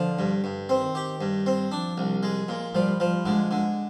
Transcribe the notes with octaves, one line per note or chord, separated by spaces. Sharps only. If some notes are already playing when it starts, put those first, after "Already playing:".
Already playing: D3 F3
G2
G2
D#3 C4
G4
G2
C4
F3 D4
C2
G#3
A#2
F3 G3
F3
D3 G#3
D3